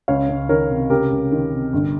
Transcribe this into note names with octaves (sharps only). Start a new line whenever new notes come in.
C#2 C#5 F5
C#2
D#3 A#4 C#5
C3
C#2 G4 A#4
C#2
D#3
C3
G1